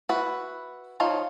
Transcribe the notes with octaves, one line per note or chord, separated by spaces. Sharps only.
E4 F#4 B4 F#5
F3 D#4 C#5 F5